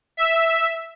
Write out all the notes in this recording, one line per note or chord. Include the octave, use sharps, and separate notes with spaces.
E5